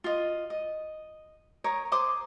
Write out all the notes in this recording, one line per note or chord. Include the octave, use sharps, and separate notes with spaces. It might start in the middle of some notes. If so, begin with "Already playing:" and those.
F4 D#5
D#5
A#4 C#5 D#6
C5 C6 D6 D#6